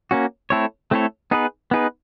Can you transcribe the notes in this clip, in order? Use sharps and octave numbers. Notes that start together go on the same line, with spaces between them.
A#3 C#4 F#4
A3 C4 E4 A4 C#5
A3 C4 E4 A4 C#5
B3 D#4 G#4 B4
B3 D#4 G#4 B4